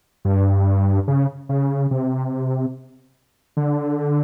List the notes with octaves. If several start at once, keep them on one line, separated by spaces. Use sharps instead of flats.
G2
C#3
C#3
C3
D3